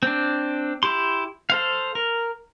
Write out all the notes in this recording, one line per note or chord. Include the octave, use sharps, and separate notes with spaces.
C4 D4
E4 G4 C6
A4 C5 F5
A#4